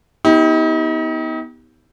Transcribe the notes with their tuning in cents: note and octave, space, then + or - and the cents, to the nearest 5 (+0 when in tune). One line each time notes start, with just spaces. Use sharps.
B3 +0 D#4 +40 G4 +0